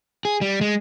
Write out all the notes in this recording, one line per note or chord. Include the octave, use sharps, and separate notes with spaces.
G#4
G3
G#3